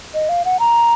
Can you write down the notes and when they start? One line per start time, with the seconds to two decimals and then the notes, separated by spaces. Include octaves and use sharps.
0.14 D#5
0.29 F5
0.45 F#5
0.60 A#5